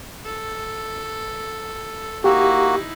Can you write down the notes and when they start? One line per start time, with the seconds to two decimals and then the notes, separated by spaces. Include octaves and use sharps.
0.25 A4
2.24 A#3 D#4 E4 F#4 G4